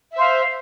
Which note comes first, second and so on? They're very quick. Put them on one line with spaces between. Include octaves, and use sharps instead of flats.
E5 C5 F5